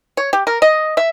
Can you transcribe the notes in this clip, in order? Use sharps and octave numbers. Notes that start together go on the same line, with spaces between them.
C#5
G4
A#4
D#5
E5